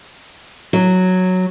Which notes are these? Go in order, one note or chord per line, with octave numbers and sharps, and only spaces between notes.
F#3